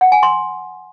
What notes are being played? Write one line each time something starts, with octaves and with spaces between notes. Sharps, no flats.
F#5
G#5
C6